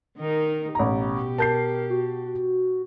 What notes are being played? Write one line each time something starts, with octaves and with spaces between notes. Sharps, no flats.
D#3 D#4 A#4
A1 B2 G4 A#5
A#4 A5 G6 C7
F#4
F#4